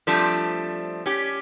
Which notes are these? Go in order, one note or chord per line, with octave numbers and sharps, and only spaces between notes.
F3 G3 A3 C4 D4
C#4 G4